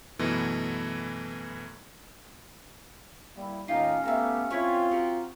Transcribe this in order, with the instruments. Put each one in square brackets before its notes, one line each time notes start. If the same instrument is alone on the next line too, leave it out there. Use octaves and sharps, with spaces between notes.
[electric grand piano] F#2 B2 E3 A3
[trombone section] G3 A#3 E4
[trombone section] D#2 A2 D#4 [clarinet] C#4 [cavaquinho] F4 G4 G5
[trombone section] A3 B3 G4 [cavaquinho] E5 F5 A#5
[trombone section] C4 F4 [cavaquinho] E4 B4 C#5
[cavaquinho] F#4 G4 A#4